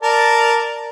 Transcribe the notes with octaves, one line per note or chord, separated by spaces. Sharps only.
A#4 D5 A5